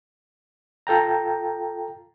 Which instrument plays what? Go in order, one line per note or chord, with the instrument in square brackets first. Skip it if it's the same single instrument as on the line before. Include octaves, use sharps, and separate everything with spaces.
[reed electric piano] F4 A4 G5 A#5